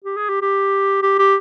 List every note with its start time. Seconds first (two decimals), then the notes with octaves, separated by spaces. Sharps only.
0.04 G4
0.17 G#4
0.29 G4
0.42 G4
1.02 G4
1.19 G4